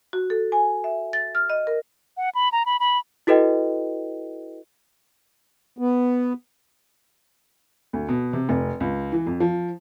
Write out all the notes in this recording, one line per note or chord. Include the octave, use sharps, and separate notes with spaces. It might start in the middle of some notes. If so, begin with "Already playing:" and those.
F#4
A4
G#5
E5
A6
F6
D#5
A#4
F#5
B5
A#5
B5
B5
E4 F#4 A4 B4 D#5 G5
B3
D2
B2
C3
F1
C#2
E3
F2
F3